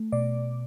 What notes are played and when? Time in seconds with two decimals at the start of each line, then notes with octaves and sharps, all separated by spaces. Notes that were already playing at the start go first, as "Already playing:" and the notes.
Already playing: A3
0.12 B2 D5